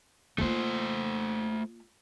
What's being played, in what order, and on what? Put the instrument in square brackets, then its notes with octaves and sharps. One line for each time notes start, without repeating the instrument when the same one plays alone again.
[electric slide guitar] A3 C5 [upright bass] A#3 F4